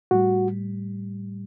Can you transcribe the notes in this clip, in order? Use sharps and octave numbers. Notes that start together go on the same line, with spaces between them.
A2 G3 F#4